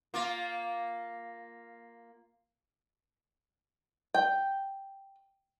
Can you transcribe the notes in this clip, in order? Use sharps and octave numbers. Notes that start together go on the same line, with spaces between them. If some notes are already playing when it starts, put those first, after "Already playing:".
A#3 F4
G5